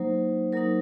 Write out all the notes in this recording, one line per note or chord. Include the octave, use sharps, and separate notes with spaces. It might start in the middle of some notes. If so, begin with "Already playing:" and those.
Already playing: F#3 A#3 D#4 C5
F#3 A#3 D#4 A#4